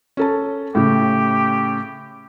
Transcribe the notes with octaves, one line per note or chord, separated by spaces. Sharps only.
C#4 A4 A5
A2 C#3 G4